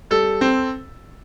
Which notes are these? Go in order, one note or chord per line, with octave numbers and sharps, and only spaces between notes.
G3 A4
C4